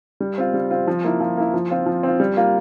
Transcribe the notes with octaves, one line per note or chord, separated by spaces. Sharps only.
G3
C4 F4
G3
C4 F4
F3
A#3 E4
F3
A#3 E4
F3
C4 F4
F3
C4 F4
G3
A#3 F4